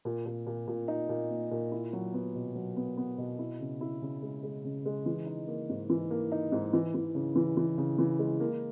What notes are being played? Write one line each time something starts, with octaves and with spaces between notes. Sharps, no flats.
A#2
A#2
A#2
A#2
D#4
A#2
A#3
A#2
E4
F#3
B3
B2
F#3
B3
B3
B2
E4
C#3
E4
C#3
G#3
G#3
C#3
G#3
E3
D#4
A#3
G#2
E3
A#3
D#4
G#2
E3
E3
C#3
E3
E3
C#3
E3
G#3
A#3